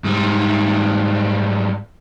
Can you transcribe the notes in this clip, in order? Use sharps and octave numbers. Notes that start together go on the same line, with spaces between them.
G#2 G3